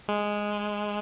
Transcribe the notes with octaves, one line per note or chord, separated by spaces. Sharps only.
G#3